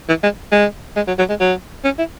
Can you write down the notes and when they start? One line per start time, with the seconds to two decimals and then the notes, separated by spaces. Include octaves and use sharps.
0.08 E3
0.23 G#3
0.52 G#3
0.96 G#3
1.07 F#3
1.19 F#3
1.29 G#3
1.40 F#3
1.84 C#4
1.98 E4